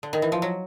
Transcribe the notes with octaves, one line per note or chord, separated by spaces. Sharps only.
D3
D#3
E3
F3
F#3